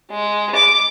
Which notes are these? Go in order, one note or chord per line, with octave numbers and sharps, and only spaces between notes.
G#3
D6